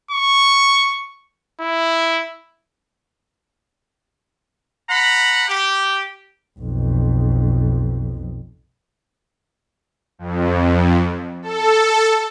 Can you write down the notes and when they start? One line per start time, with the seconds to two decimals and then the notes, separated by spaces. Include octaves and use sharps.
0.11 C#6
1.61 E4
4.89 F#5 A#5 B5
5.48 G4
6.59 B1 F2
10.19 F2
11.42 A4